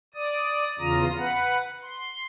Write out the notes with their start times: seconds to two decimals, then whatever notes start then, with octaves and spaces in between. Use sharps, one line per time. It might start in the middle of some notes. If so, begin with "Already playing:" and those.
0.14 D5 D#6
0.79 E2 C#3 F4 A#5 D#6
1.18 B4 F#5
1.82 C6